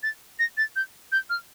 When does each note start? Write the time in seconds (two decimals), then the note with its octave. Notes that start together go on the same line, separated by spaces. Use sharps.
0.03 A6
0.39 A#6
0.57 A6
0.76 G6
1.12 G6
1.30 F6